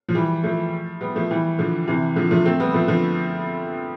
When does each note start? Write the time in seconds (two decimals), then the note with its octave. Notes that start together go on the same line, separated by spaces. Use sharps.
0.09 F3
0.15 E3 G3
0.43 F3 A3
1.01 G3 B3
1.16 F3 A3
1.30 E3 G3
1.58 D3 F3
1.87 C3 E3
2.16 D3 F3
2.31 F3 A3
2.45 A3 C4
2.60 G3 B3
2.74 F3 A3
2.88 D3 F3